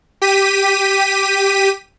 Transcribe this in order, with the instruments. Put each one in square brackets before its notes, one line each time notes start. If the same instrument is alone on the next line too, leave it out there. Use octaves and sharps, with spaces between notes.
[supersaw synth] G4 B6 D#7